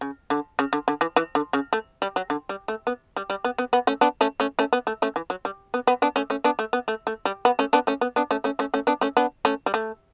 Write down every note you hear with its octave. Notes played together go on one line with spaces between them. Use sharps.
C#3
D3
C#3
D3
D3
E3
E3
D3
C#3
A3
G3
F#3
D3
G3
A3
B3
G3
G3
B3
B3
B3
A3 C#4
B3 D4
A3 C#4
A3 C#4
A3 C#4
B3
A3
A3 C#4
E3
F#3
G3
B3
B3
B3 D4
A3 C#4
A3 C#4
B3 D4
A3
B3
A3
A3
G3
B3
A3 C#4
B3 D4
A3 C#4
B3
B3 D4
A3 C#4
A3 C#4
A3 C#4
A3 C#4
B3 D4
A3 C#4
B3 D4
A3 C#4
G3
A3